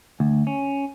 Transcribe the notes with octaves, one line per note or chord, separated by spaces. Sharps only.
D2
C#4